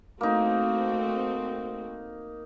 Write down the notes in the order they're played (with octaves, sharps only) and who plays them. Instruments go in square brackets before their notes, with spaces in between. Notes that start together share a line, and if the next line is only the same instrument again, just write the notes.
[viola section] A3 C4 F#4 [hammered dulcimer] A#3 D#4